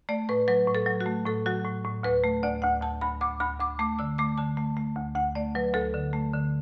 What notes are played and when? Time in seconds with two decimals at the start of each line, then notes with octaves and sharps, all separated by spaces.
0.09 A3 D5
0.29 A2 B4
0.48 F#3 B4
0.68 A2
0.75 A4
0.86 F#3
1.01 F#4
1.06 A3
1.25 A2 A4
1.46 F#3 F#4
1.65 A2
1.85 A2
2.03 D2 B4
2.24 A3
2.43 D2 D5
2.62 D2 F#5
2.81 D2 A5
3.01 D2 B5
3.20 D2 D6
3.40 D2 B5
3.60 D2 D6
3.79 A3 D6
3.99 D3 E6
4.18 A3 D6
4.38 D3 A5
4.57 A3
4.77 A3
4.97 D2
5.15 D2 F#5
5.35 A3 D5
5.55 F#3 B4
5.74 D2 A4
5.94 D3
6.13 A3
6.33 D3